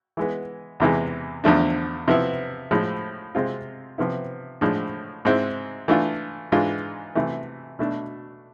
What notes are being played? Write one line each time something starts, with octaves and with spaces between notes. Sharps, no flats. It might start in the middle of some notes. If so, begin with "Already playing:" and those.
E3 G#3 B3
E2 C3 E3 G#3
E2 D3 F3 A3 D4
C3 F3 B3 E4
A2 F3 G#3
C3 G#3 C4 F4
C3 F3 B3 E4
A2 F3 G#3 D4
G#2 G#3 C4 E4
E3 A3 D4 F4
G#2 E3 G#3 D4 F4
C3 E3 A3
B2 A3 D4